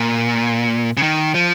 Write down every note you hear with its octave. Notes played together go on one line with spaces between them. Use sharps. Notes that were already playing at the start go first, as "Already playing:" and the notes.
Already playing: A#2
C#3
D#3
F3